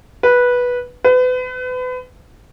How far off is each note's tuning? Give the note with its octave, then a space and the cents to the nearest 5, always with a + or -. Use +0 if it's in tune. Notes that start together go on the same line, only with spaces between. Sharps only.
B4 -10
B4 +35